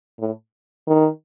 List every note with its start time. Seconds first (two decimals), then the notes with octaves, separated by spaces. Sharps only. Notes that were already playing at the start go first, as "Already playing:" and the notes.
0.19 A2
0.87 D#3